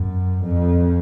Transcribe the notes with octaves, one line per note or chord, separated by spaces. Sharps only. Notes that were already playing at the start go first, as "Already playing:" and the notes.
Already playing: F#2
F2